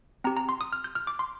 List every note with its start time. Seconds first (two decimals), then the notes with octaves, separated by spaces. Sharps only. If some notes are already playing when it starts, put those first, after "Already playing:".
0.24 C4 G4 A#5
0.37 A#5
0.49 C6
0.61 D#6
0.73 F6
0.84 G6
0.95 F6
1.07 D6
1.19 C6